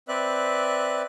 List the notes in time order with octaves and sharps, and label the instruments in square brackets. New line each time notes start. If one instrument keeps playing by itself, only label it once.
[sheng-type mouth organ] C4 B4 D5 E5 F#6